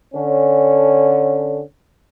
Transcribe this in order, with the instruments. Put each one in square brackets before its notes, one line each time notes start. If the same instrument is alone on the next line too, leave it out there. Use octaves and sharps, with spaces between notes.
[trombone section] D3 C#4